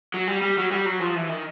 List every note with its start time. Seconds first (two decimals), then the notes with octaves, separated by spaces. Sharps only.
0.14 F#3
0.28 G3
0.42 G3
0.58 F#3
0.72 G3
0.86 F#3
1.00 F3
1.15 E3
1.29 D#3